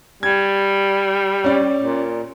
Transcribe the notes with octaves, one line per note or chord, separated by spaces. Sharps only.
G3 G#6
C#4 D5
A#2